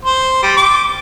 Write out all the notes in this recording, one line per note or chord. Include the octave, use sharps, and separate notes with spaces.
C5
G3
D6